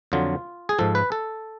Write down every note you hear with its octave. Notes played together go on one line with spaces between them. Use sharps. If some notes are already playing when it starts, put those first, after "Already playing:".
F2 D3 F#3 F4
G#4
G#2 F3 A4
B4
A4